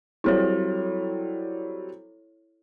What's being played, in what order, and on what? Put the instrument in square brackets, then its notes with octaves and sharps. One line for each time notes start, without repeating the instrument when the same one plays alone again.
[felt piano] F#3 G3 C4 [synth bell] E4 A4 C#5